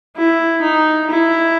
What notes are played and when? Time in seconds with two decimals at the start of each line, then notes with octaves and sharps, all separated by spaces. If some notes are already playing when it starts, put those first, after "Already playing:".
0.16 E4
0.61 D#4
1.09 E4